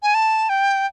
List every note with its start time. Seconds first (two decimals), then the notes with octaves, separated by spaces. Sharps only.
0.03 G#5
0.14 A5
0.49 G5